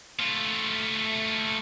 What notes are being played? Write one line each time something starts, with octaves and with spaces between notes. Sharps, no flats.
A3 F4